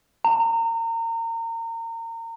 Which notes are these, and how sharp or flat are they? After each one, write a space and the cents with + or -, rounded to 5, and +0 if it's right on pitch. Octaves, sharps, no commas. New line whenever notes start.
A#5 -30